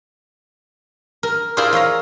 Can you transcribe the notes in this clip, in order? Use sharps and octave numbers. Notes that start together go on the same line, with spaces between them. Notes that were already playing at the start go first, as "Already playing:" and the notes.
A#4
E4 F4 G#4 A#4 C5 D5
F4 C#5 F5 A#5